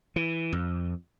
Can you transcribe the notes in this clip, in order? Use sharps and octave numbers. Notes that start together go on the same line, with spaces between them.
E3
F2